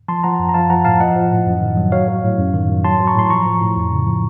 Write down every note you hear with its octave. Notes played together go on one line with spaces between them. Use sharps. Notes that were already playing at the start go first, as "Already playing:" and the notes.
F3 A5 C6
F3 F#5 A#5
F#2
A#5
F3 F5 A5
F3 F#5 A#5
A2 F5 A5
F3 D#5 F#5
F3
A2
F#2
D#3
F#3
F#3 C#5 F5
F#3
A2
F#2
D#3
F#3
F#3 A5 C6
F#3
A#5 C#6
A2 C6
F3 A#5 C#6
F3
A2
F2
C#3
F3